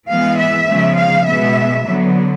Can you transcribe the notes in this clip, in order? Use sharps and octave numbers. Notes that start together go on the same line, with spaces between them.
E3 G#3 B3 F5
E5
C#3 F3 G#3 B3
F5
B2 G#3 B3 E5
D3 F#3 B3